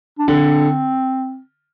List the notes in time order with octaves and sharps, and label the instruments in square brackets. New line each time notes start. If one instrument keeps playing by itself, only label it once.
[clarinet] D4
[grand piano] D3 [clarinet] C4